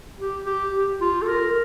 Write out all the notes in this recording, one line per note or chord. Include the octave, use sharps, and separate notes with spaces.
G4
G4
G4
F4
A4
A#4